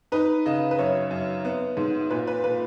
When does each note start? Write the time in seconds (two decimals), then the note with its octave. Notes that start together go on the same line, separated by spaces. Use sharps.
0.12 D#4 B4
0.46 C#3 D#5
0.71 B4
0.79 F#2 C#5
1.11 F#2
1.45 B3
1.77 G#2
2.10 A#2 B4
2.27 B4
2.44 A#2 B4